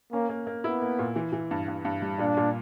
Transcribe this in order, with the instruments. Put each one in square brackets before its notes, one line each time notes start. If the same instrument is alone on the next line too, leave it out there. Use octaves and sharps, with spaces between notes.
[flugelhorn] A#3 [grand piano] C#4
[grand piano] A#3
A#3
[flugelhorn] B3 [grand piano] E4
[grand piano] A#3
A#2
E3
E3
G2
G2
G2
G3
[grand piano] A#2 [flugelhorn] D4
[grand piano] A#2